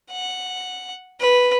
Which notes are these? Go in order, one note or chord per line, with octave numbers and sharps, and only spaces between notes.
F#5
B4